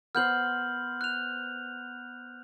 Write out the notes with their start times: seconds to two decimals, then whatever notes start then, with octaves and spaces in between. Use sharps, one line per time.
0.15 B3 C5 F6 G6 F#7
1.01 F#6 F7